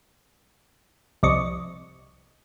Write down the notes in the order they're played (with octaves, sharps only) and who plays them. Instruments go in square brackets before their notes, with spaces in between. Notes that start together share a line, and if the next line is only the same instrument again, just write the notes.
[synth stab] C2 F2 D5 D#5 C#6